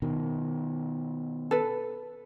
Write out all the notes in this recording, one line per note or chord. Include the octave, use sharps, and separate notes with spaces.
B2 D#3
A4 B4